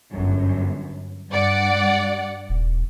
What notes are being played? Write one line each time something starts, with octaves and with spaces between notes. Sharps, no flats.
G1 F#2
G2 D5 F#5
D#1